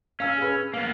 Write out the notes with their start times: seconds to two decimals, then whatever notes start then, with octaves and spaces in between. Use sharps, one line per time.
0.20 C#4 F5 E6
0.38 G#4 B4
0.74 A#3 B3 F5